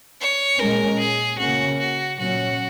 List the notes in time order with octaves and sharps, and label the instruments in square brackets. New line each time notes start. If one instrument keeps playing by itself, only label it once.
[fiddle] C#5
[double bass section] A#2 G#3 C#4 [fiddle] A#4
[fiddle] G#4
[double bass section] C#3 A#3 C#4 [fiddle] F#4
[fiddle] F#4
[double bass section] A#2 F#3 C#4 [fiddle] F#4